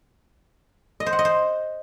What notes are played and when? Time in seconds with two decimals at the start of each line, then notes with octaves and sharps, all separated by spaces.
1.00 D#5
1.06 C5
1.13 F#5
1.19 D#5
1.25 C5